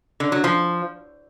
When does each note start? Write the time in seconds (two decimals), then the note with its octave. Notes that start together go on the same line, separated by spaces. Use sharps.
0.20 D3
0.32 F#3
0.44 F3